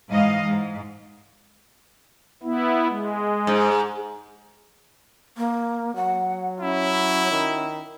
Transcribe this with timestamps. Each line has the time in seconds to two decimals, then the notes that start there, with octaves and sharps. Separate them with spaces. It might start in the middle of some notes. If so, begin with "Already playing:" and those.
0.10 G#2 E3 D#5 F5
0.44 G#2
2.43 B3 E4
2.89 G#3
3.47 G#2
5.37 A#3
5.96 F#3 F#5
6.61 C#4 E4
7.32 D#3